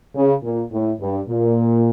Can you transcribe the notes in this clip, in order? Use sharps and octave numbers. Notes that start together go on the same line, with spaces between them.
C#3
A#2
A2
G2
A#2